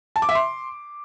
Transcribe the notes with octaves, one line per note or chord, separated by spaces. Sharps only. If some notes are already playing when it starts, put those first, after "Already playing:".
A5
D6
E5
C6